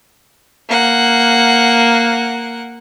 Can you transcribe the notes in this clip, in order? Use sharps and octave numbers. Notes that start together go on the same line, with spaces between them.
A#3 F#5